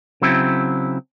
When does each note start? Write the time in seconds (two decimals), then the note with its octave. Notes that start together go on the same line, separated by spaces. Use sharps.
0.22 C#3 F#3 C4 E4